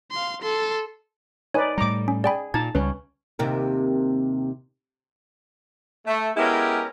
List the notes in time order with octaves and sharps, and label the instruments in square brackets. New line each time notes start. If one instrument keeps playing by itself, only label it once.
[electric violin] F5 C6
A4 C6
[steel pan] D#4 B4 D5 [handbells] C#5 G#5
[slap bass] A2 G3 [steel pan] A#5 D6
[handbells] C#4
[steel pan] G#4 [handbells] D5 G5 B5
[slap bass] A#2 [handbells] D#4 G#6 [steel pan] A5
[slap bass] C#2 G3 [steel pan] C#4 [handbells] B4
[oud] D#2 C3 A#4
[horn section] A3
G#3 B3 C#4 E4 G4 A#4